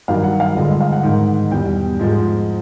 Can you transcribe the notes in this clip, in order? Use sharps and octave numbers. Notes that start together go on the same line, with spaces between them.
G2 D#3 F#3 F5
F#5
F5
G2 D3 F3 G#3 D#5
D#5
F5
F#5
G#2 D#3 G#3
E2 B2 G3 G5
G#2 F3 G#3